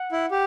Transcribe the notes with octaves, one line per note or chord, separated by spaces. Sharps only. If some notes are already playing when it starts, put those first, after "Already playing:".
Already playing: F#5
E4
G4